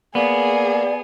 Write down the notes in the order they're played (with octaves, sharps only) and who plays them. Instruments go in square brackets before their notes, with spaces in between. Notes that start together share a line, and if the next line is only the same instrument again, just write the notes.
[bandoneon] A#3 [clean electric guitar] B3 [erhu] G#4 [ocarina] D5